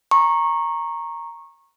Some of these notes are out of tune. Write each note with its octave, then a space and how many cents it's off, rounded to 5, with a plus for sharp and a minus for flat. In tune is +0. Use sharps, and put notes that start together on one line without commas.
A#5 +0 C#6 -20